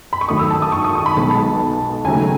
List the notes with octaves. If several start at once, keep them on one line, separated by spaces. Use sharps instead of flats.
B5
C#6
D#2 D#3 F#3 A3 D#6
E6
A5
D#6
C#6
D#6
C#6
B5
B1 B2 G#3 B3 A5
D#2 C#3 F#3 A3 G#5